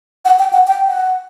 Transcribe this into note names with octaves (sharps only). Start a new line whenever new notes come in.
F#5
G5
F#5
G5
F#5